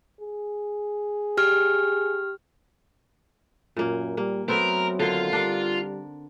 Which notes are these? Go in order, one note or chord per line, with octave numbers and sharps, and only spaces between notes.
G#4
G4 F6
F#2 A#2 A#3
G3 A#3
F#3 A3 B3 C4 A#4
D3 D#3 F4
G3 D4 A#4